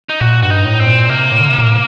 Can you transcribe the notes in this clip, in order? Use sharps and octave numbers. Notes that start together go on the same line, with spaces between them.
D#4
A#2 F#4
G2 F#4
D#4
A2
C4
A#2
C3 A#3
A2
D3
C3
A#2
A2